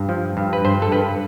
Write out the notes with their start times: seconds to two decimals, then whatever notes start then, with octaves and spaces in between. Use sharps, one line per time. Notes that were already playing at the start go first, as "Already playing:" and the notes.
Already playing: G2
0.09 F3
0.37 G2
0.53 B4
0.65 G2 C5
0.82 A4
0.92 G2 B4